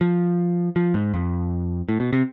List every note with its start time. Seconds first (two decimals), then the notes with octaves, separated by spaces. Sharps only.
0.01 F3
0.76 F3
0.94 G#2
1.14 F2
1.89 A2
2.00 B2
2.13 C3